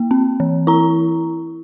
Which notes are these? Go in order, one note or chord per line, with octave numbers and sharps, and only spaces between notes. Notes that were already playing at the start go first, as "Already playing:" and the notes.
Already playing: A#3
C4
E3
E4 A#5